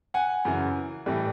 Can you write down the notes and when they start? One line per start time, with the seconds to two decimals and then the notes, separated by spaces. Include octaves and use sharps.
0.14 F#5 G#5
0.45 F#2 C#3 E3
1.06 A2 E3 G3